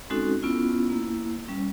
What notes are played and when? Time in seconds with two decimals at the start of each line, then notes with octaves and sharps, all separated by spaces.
0.10 G#3 C4 C#4 D#4 F#4 A4
0.43 B3 C#4 E4 F4
0.90 A#3 E4
1.48 G3 C#4